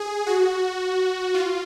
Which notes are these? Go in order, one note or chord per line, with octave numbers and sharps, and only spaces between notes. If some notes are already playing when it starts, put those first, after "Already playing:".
Already playing: G#4
F#4
F4